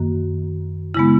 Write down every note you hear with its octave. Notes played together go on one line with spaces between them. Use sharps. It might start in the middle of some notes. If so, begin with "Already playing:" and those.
Already playing: F#2 D#3 A#3 F#4
C#3 G#3 B3 E4